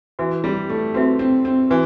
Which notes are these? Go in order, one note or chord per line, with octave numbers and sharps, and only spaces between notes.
E3 F#4 B4 E5
G3
A3
C4 F#4 B4 E5
C4
C4
E3 F#4 B4